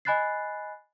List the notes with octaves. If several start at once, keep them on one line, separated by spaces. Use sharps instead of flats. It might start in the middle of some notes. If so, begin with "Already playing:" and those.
D#5 G#5 B5 F#6 A6 C7